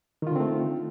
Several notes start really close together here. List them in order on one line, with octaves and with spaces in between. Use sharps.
D#3 F4 D3 C4 A3